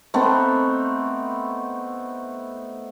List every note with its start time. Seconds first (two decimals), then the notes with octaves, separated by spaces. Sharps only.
0.14 A3 B3 C4 D#4